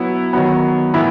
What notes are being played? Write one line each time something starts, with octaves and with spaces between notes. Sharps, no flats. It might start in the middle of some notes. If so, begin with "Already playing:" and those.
Already playing: F#3 B3 E4
D#3 F#3 B3
A2 E3 B3 E4